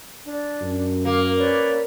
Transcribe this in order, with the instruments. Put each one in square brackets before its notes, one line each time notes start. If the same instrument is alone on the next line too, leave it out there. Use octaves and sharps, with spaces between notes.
[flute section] D4
[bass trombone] F#2
[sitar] A#3 [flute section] F5
[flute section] C#4 B4 D5